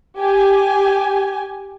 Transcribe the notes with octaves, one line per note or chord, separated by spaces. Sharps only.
G4 G#5